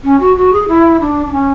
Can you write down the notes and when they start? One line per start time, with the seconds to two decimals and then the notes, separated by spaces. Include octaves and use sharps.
0.04 C#4
0.20 F#4
0.36 F#4
0.53 G#4
0.68 E4
1.00 D4
1.27 D4
1.32 C#4